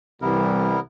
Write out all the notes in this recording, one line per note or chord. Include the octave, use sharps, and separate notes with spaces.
C2 E3 G3 B3 E4 A#4